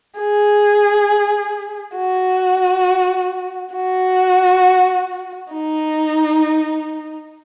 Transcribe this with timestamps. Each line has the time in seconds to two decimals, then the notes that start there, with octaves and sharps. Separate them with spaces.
0.19 G#4
1.97 F#4
3.75 F#4
5.53 D#4